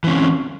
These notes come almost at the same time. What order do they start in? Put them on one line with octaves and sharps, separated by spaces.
E3 C#4 C4